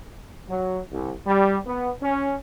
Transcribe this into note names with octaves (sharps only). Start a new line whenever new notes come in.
F#3
C2
G3
B3
C#4